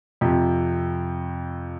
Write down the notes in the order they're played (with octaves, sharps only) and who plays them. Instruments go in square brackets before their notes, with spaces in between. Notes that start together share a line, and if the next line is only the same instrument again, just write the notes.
[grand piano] F2 C3 F3